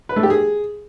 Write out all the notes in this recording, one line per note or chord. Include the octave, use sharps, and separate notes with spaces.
B4
A3
G4
G#4